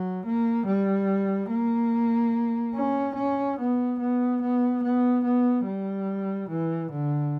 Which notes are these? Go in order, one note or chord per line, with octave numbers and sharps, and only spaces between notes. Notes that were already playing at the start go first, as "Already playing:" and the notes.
Already playing: F#3
A#3
G3
A#3
C#4
C#4
B3
B3
B3
B3
B3
G3
E3
D3